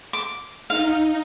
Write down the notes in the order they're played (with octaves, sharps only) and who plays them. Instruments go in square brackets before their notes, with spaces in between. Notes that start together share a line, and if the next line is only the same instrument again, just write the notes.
[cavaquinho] D6
[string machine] D#4 [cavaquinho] F5